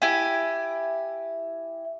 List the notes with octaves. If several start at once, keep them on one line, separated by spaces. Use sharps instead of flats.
E4 G4 G#5